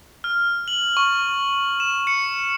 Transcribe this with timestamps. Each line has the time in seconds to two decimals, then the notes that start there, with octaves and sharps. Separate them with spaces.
0.24 F6
0.68 F#7
0.97 C#6
1.80 E7
2.07 C#7